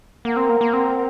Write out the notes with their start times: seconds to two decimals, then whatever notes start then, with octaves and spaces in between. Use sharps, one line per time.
0.25 A#3 A#4 F#5 A#5
0.36 C4
0.49 A#3
0.61 A#3
0.73 C4